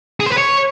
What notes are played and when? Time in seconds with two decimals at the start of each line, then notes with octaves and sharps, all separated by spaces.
0.20 G#4
0.26 C5
0.32 B4
0.38 C#5